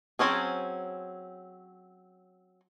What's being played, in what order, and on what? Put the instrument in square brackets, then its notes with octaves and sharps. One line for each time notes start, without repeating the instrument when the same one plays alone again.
[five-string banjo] F#3 C4 C#4 G#4